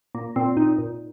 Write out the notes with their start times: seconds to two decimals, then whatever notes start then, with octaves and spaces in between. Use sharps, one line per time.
0.15 A#2 A#3
0.36 A#2 C4
0.57 A#2 D#4
0.78 A#2